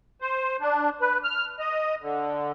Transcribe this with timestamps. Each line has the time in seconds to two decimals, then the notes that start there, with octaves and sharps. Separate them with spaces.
0.21 C5
0.61 D4
1.01 B4
1.24 F6
1.59 D#5
2.02 D3